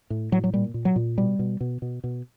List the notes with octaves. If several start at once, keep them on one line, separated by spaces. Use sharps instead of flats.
A2
A2 F#3
F#3
A#2 G3
A#2
F#3
A#2
B2 G3
B2
B2
B2
B2